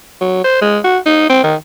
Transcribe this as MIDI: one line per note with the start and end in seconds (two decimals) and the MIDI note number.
0.21 0.41 54
0.45 0.57 72
0.62 0.79 56
0.85 0.98 66
1.06 1.26 63
1.30 1.44 60
1.44 1.55 51